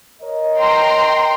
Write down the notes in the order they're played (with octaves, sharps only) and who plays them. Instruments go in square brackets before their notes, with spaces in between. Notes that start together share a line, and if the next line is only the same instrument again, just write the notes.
[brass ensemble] A#4 C#5 D#5
[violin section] G5 A#5 C6